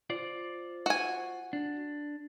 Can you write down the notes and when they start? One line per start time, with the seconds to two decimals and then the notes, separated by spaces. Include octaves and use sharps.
0.10 F4 C5 D5
0.86 F#4 G#5
1.53 D4